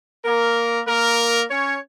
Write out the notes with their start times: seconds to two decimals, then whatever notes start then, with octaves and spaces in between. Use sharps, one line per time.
0.24 A#3 A#4
0.86 A#3 A#4
1.49 C#4 C#5